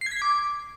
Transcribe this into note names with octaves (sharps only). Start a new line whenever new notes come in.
C7
G#6
B6
G#6
D6